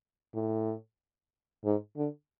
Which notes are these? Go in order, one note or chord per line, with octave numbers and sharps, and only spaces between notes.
A2
G#2
D3